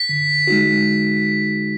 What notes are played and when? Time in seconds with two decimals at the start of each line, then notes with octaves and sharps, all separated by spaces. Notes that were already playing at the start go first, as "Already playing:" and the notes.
Already playing: B6
0.09 D3
0.47 G#3 D#4 F#4